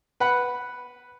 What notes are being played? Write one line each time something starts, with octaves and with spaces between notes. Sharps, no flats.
B4 F#5 B5